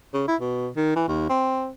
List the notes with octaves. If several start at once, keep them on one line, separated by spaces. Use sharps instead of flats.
C#3
E4
B2
D#3
E3
D#2
C4